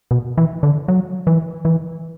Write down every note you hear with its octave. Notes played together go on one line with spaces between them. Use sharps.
B2
E3
D3
F#3
E3
E3